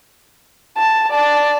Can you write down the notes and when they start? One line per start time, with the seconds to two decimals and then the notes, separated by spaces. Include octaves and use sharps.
0.77 A5
1.10 D5 A5